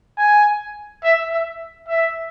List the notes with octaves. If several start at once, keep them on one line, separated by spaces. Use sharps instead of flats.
G#5
E5
E5
E5